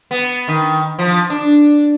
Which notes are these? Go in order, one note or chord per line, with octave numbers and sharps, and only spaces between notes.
B3
D#3
F3
D4